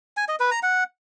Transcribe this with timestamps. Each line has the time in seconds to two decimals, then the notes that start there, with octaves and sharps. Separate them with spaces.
0.17 G#5
0.28 D#5
0.40 B4
0.51 A#5
0.63 F#5